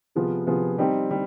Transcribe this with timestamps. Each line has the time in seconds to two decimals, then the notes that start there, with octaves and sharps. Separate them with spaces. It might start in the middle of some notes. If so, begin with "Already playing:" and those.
0.15 C3 F3 B3 F4 G#4
0.47 C3 F3 B3 F4 G#4
0.78 G3 C4 D#4 G4
1.11 G3